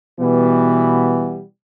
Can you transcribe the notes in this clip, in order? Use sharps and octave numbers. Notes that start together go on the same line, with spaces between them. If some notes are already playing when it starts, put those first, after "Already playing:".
B2 E3 G3 B3